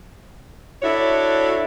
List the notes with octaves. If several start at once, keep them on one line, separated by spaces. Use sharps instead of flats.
D4 E4 F#4 A4 C#5